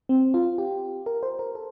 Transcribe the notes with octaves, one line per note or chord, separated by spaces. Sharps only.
C4
F4
G4
A#4
C5
A#4
A4